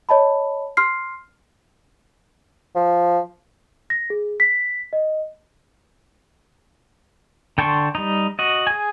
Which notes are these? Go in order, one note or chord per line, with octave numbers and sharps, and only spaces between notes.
C#5 D#5 A5 B5
C6 F6 C7
F3
A#6
G#4
B6
D#5
D3 G5 A5 C6 C#6
G3 D#4
F#4 D#5
G#4 G#5